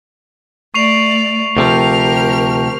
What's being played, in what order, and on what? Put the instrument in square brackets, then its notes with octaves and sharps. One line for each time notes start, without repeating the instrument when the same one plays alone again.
[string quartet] A3 D5 [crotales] C#6 C7 F7
[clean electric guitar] D2 C3 F3 [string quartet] G4 A#4 F6